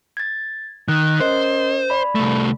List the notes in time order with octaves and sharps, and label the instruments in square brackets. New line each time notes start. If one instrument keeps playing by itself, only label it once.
[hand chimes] G#6 A6
[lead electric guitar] D#3 [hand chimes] F#6
[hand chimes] C#4 A#4 D#5 [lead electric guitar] C5
[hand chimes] D5 B5
[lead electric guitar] C2 A3